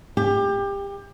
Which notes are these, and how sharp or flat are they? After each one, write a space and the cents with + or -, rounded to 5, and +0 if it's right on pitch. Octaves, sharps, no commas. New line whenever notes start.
G4 +25